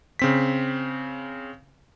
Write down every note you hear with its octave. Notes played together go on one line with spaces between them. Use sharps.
C#3 C4 B6